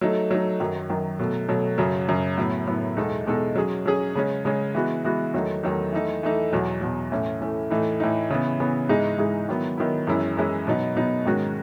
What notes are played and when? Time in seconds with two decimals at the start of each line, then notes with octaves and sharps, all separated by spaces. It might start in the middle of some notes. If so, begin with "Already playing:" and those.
0.01 F#3 A3 D#4
0.31 F#3 A3 D#4
0.60 F#2 D#3 F#3
0.90 F#2 D#3 F#3
1.19 B2 F#3 A3
1.49 B2 F#3 A3
1.78 F#2 C#3 F#3
2.09 F#2 C#3 F#3
2.38 A2 F#3 B3 E4
2.67 A2 F#3 B3 E4
2.97 E2 B2 G#3 D#4 A4
3.26 E2 B2 G#3 D#4 A4
3.55 F#3 C#4 G#4
3.86 F#3 C#4 G#4
4.15 C#3 G#3 C#4
4.45 C#3 G#3 C#4
4.75 E3 G#3 B3 F#4
5.04 E3 G#3 B3 F#4
5.33 E2 D#3 F#3 A3 D#4
5.63 E2 D#3 F#3 A3 D#4
5.92 E3 A3 D#4
6.23 E3 A3 D#4
6.52 E2 B2 F#3
6.81 E2 B2 F#3
7.11 A2 E3 A3 C#4
7.40 A2 E3 A3 C#4
7.70 A2 E3 A3 D#4
8.00 A2 E3 A3 D#4
8.30 C#3 E3 B3
8.60 C#3 E3 B3
8.89 G#2 E3 G#3 D#4 G#4
9.18 G#2 E3 G#3 D#4 G#4
9.49 D#3 F#3 B3 E4
9.78 D#3 F#3 B3 E4
10.07 F#2 E3 G#3 C#4 E4
10.37 F#2 E3 G#3 C#4 E4
10.67 B2 F#3 B3 D#4
10.96 B2 F#3 B3 D#4
11.25 G#2 D#3 G#3 C#4 F#4